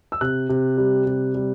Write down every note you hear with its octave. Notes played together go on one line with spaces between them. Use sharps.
E6
C3 F#6
C3
G3
C3
G3